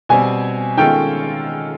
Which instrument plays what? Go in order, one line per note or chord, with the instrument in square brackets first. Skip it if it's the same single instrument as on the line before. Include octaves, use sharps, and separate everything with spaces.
[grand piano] B2 G3 C4 [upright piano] G#5
[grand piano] D#3 G#3 C#4 F4 A4 [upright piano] G5